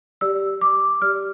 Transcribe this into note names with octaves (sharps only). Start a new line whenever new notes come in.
G4 D5 E6
D6
G4 D5 F6